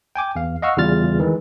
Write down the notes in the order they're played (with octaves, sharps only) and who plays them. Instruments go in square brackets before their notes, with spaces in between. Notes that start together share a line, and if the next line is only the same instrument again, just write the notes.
[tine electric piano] G5 G#5 D6
E2 F5
D#5 F5 F#5 C#6 E6 F6
E2 C#3 G3 F4 F6 A6
D#3 E3 G#3